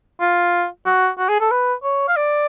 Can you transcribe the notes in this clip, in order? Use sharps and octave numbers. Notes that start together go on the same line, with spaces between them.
F4
F#4
F#4
G#4
A4
B4
C#5
F5
D5